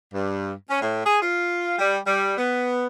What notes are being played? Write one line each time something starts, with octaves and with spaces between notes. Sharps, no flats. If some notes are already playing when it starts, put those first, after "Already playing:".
G2
C#4
A2
G#4
F4
G3
G3
B3